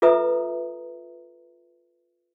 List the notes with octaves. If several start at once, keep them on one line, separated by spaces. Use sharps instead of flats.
F4 A4 B4 E5 A#5 D#6